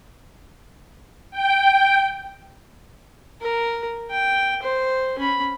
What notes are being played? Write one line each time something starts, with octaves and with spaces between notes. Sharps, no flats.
G5
A#4
G5
C5
C#4 B5